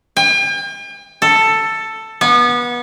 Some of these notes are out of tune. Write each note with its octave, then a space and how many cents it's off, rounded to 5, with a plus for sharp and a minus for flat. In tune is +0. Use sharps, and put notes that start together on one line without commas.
G5 +45
A4 +10
B3 -25